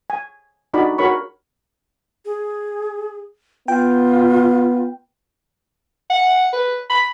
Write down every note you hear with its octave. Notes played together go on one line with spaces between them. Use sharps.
G#5
D4 D#4 F#4 D5 B5
F#4 G#4 A#4 C#5 B5 C#6
G#4
B3 F4 G5
F#5
B4
B5